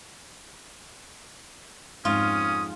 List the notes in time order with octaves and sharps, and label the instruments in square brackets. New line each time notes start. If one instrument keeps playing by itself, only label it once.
[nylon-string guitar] F2 G#2 [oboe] C#4 [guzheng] F4 [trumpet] D#6